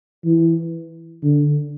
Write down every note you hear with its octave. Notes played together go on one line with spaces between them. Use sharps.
E3
D3